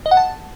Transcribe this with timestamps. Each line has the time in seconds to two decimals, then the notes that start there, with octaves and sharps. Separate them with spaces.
0.06 D#5
0.11 F#5
0.17 A5